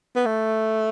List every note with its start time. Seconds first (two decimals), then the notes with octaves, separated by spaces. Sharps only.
0.16 B3
0.26 A3